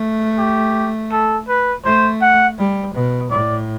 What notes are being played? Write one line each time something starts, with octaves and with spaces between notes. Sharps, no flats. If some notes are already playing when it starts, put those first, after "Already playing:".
Already playing: A3
G4
A4
B4
A3 C5
F#5
G3
B2
A2 D5